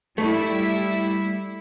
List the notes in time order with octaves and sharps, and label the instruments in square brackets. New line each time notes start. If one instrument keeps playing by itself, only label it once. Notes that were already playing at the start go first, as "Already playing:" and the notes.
[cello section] G3 E4 [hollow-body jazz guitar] A3